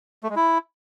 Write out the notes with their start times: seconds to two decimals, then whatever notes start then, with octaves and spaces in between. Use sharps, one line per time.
0.23 A3
0.30 G#3
0.36 E4